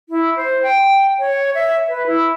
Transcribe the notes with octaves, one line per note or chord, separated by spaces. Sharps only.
E4
C5
G5
C#5
E5
B4
E4